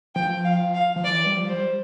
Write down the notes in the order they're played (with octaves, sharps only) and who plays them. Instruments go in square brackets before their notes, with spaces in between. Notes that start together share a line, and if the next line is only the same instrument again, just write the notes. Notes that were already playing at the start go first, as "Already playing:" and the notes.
[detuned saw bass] F3 [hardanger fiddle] G5
[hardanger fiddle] F5
F5
[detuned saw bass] F3
[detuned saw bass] E3 [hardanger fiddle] D5
[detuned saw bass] G3
F3
[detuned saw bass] G3 [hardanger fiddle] C5